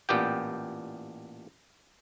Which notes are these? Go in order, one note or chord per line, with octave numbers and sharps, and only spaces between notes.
A1 A#2 B3 G4 G5